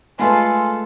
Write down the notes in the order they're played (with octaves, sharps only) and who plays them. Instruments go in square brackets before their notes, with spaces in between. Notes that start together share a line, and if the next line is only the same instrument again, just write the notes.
[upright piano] G#3 A3 B4 [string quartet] F4 A4 [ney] G#5